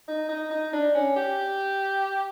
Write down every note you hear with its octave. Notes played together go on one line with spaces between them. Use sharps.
D#4
D#4
D#4
D4
C#4
G4